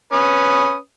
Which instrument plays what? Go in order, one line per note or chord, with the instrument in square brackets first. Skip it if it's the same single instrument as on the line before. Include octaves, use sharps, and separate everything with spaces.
[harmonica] C#4 B4 D#6